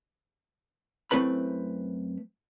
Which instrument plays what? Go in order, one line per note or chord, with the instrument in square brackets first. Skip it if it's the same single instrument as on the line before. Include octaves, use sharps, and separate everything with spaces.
[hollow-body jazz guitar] F#2 A3 C4 E4 B4 B5